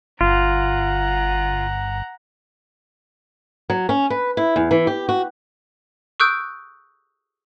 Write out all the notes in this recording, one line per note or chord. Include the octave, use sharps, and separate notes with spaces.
G1 F4 F#5 A#5
F#3
C#4
B4
E4
E2
E3
G4
F#4
C#6 D#6 E6 F#6 G6 D7